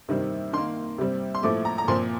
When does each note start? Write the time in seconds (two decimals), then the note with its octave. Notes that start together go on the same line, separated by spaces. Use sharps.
0.09 C3 D#3 G3 C4
0.53 D#3 A#3 C6
0.98 C3 G3 C4
1.35 C6
1.43 A2 F3 A3 D6
1.65 A#5
1.78 A#5
1.88 A#2 F3 C4 C6